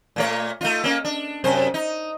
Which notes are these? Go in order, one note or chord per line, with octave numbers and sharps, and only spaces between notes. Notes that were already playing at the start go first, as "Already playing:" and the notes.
A#2 A3 C#5
A3 D#4 F4
A#3 C#4
D4
F#2 C3 C5
D#4